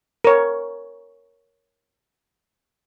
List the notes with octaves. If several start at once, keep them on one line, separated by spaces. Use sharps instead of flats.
A#4 C#5